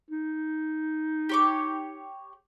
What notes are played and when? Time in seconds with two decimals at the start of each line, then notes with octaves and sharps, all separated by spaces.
0.11 D#4
1.29 G4 C#5 D6